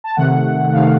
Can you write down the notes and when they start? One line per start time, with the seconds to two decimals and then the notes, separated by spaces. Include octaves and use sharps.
0.04 A5
0.16 C3 D#3 A3 F#5
0.73 C3 D#3 A3 F5